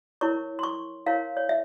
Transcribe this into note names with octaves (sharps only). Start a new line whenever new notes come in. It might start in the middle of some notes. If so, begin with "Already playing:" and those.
E4 A#4 C#5 C#6
C6
C#6
E4 A#4 C#5 F5
C#5
E5